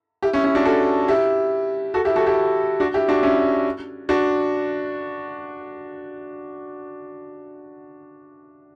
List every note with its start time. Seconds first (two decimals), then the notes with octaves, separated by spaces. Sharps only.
0.23 E4 G4
0.33 C#4 E4
0.44 C#4 E4
0.55 D4 F#4
0.65 F#4 A4
1.08 E4 G4
1.94 F#4 A4
2.05 E4 G4
2.16 F#4 A4
2.26 E4 G4
2.80 D4 F#4
2.94 E4 G4
3.08 D4 F#4
3.23 C#4 E4
4.09 D4 F#4